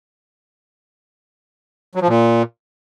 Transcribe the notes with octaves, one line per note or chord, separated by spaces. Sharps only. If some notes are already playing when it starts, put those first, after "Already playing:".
F#3
F3
A#2